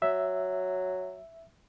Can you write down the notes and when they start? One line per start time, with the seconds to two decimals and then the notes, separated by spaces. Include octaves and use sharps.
0.02 F#3 E5